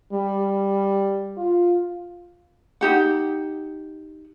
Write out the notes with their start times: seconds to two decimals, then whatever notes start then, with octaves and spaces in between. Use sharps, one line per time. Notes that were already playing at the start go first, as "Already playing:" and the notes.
0.13 G3
1.37 F4
2.81 D#4 G4 F#5